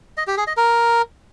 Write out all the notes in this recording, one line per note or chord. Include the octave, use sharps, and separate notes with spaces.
D#5
G4
G#4
D#5
A#4